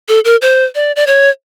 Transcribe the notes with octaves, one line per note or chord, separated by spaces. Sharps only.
A4
A#4
C5
D5
D5
C#5